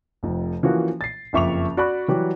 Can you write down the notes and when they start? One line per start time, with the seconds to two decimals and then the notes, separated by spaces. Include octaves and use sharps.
0.23 F1 F2
0.63 E3 F3 A#3 C#4 F#4
1.01 A6 C7
1.33 F#1 F2 E5 C#6 D6 F7
1.77 F#4 D5 B5 C#6 F#6
2.08 E3 F#3 G3 F#4 G4